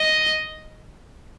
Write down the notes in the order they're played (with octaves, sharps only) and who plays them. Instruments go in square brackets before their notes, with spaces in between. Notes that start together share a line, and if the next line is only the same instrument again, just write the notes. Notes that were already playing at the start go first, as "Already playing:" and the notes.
Already playing: [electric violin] D#5